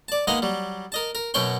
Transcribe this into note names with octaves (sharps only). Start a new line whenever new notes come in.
D5 A5
G#3 A#3 B3 D#4 D#5 F5
F#3 G3
A#4 D#5 A5
A#4
F#2 B2 F#3 C#5 G5 C6